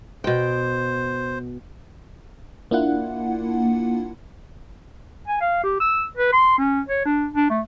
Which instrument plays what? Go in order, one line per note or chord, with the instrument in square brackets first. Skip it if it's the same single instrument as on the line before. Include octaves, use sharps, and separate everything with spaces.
[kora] B2 G5 [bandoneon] C5
[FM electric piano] A#3 D4 E4 F4 F#5
[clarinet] G#5
F5
G4
E6
B4
C6
C#4
C#5
D4
D4
A3